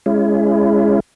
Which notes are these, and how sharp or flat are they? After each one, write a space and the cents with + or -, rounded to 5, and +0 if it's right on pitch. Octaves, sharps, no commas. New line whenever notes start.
G#3 +0 C#4 +0 E4 +30